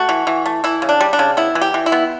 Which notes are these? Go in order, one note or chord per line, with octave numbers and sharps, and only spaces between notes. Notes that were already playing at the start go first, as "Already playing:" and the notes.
Already playing: A3 F#4
E3
E3
A3
E3 E4
C#3
D4
G3
D4
C#3
B3 E4
E3
G4
E3
E4
B3